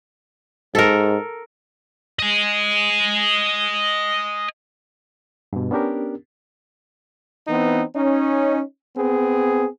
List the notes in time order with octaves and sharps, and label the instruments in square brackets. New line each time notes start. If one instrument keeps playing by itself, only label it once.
[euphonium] G#2 [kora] A4 A#4
[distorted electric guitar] D#5 G#5
[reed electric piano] G2 B2
B3 C#4 D4 G4 A#4
[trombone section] E3 B3 C4 D#4
C#4 D#4
B3 C4 G#4